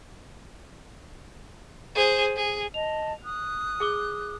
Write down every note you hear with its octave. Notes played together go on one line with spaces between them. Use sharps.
G#4 C5
G#4
D#5 A5 F7
D#6 F#6
G#4 D6 G7